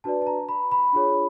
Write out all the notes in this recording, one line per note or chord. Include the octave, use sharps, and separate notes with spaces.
D4 F#4 B4 D5 A5
A5
A#5
B5
B5
D4 F4 G#4 C#5